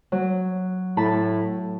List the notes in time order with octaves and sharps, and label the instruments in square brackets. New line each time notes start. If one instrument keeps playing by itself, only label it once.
[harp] F#3
[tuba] A2 [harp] A5 B5